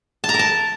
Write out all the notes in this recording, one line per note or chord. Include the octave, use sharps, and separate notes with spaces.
A5
A#5
A#4
A5